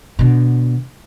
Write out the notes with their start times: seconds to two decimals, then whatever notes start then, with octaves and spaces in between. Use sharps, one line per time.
0.19 B2 D3